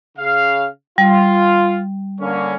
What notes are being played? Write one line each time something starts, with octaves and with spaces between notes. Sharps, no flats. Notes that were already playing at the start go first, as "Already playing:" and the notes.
C#3 F5
G3 F4
D3 A#3 C#4